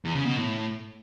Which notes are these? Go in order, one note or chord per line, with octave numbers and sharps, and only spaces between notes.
E2
C#3
B2
A2